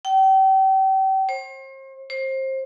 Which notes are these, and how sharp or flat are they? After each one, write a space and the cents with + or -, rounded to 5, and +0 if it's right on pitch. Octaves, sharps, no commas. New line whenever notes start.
G5 -35
C5 +40
C5 +25